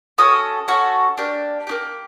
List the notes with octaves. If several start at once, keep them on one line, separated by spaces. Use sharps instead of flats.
C#4 F#4 A4 D#6
C#4 F#4 A4
A#3 D4 G4
A#3 D4 G4